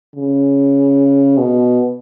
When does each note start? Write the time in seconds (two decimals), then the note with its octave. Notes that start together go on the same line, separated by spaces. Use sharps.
0.16 C#3
1.38 B2